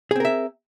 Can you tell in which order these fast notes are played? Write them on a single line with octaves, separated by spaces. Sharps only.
G#4 C4 A#4 E5